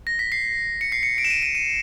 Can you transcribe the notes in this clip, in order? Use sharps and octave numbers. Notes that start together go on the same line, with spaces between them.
A#6
B6
C7
C#7
C7
C#7
D7
E7
D#7
D#7
D#7